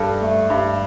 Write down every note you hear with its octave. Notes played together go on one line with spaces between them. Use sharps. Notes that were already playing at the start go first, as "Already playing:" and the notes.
Already playing: G2 A4
A3
G2